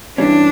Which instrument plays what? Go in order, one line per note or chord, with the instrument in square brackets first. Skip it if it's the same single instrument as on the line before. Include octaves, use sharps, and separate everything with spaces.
[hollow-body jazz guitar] G2 E3 G3 C#4 [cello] D4